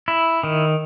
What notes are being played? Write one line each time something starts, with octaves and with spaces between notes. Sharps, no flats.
E4
D#3